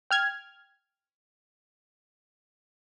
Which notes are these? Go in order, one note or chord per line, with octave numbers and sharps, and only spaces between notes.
G5 F6 G#6